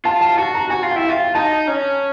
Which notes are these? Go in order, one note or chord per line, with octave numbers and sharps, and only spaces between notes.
F4 A5
A5
F#4 A5
A#5
F#4 G#5
F4
E4 G5
F4
G5
D#4 A5
C#4